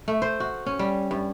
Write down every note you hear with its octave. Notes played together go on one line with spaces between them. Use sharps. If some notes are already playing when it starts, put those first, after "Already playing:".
A3
C5
F#4
C#4
G3
G2